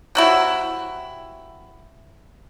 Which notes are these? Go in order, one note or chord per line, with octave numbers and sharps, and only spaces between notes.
C3 F#3 E4